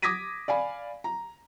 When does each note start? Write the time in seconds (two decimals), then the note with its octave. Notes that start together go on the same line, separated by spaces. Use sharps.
0.02 D6 D#6 G#6 A#6 B6 D#7
0.48 D5 F5 G#5 B5
1.04 A#5